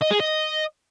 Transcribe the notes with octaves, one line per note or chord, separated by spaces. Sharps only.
D#5
G#4
D#5